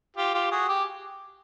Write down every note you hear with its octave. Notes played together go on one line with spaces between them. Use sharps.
F4 G4
F4 G4
F#4 G#4
G4